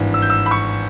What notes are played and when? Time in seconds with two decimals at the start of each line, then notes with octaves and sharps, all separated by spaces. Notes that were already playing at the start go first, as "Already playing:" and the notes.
Already playing: G#1 G2 E3
0.14 E6
0.22 G6
0.30 E6
0.46 B5
0.51 C#6